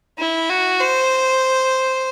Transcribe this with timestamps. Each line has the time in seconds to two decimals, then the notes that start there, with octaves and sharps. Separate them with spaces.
0.19 E4
0.50 F#4
0.80 C5